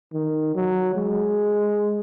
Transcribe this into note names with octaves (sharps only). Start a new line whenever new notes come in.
D#3
F#3
G#3